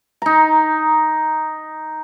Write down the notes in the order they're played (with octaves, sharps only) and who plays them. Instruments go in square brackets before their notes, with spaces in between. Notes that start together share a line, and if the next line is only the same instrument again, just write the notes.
[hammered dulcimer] D#4 A#5